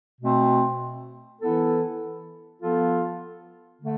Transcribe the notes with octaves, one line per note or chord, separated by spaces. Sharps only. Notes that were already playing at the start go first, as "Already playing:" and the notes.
B2 A3 C4
E3 B3 E4 A4
F3 B3 F4 A4
D3 A3